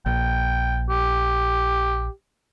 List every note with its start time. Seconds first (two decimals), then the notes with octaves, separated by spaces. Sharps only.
0.06 A#1 G5
0.89 G4